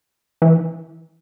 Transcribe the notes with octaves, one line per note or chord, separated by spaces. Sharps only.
E3